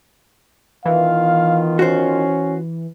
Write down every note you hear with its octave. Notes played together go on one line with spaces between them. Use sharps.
D#3 E3 B3 F4 F5
C#4 F#4 C5